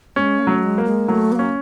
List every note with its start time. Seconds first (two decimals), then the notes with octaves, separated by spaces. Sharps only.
0.16 G#3 C#4
0.39 A#3
0.42 F#3 A3
0.63 G#3
0.78 A#3
0.86 G#3
1.08 F#3 A3
1.32 B3
1.35 A#3 C#4